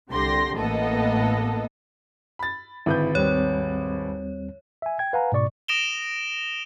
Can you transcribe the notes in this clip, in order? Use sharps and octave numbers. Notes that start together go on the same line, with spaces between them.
C2 D3 G4 C6 A#6
A1 A#3 B3 A4 D#5
B5 A6
G#1 D3 E4 B4 G6
D#2 G3 C4 C#5
E5 G#5
G5 G#6
B4 F5 F#5 G#5 A#5
G#2 B2 D5 C#6
D#6 A#6 D7 E7 F7 G7